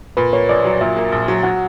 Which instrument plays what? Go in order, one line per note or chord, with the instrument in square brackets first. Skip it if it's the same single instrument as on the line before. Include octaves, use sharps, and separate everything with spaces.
[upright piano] A#2 [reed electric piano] B4
[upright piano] A#3 [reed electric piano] C#5
[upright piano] A#1 [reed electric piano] D5
[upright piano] F#3
[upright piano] A#2 [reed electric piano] E5
[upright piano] A#3
A#1
F#3
[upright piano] F#3 [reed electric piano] F#5